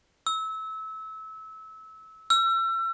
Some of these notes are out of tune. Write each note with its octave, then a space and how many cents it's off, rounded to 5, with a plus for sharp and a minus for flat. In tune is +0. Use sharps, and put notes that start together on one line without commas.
E6 -25
E6 +35